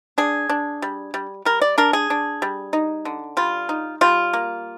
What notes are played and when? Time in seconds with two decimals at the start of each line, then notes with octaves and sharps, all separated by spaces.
0.18 D4 G#4
0.49 D4
0.82 G3
1.14 G3
1.45 G3 A#4
1.61 D5
1.78 D4 A#4
1.93 G#4
2.10 D4
2.42 G3
2.73 D#4
3.05 D3
3.37 G3 F4
3.69 D#4
4.01 G3 F4
4.33 A#3